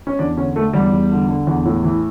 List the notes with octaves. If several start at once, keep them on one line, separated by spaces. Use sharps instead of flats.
C#4
E2 D4
D3 C#4
D3 A3
E2 G3
E2
D3
D3
E2
A2
E3